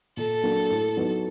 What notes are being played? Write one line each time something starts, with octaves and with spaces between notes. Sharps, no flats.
A#2 A4
F#3 A#3 D4
A2
F#3 B3 D#4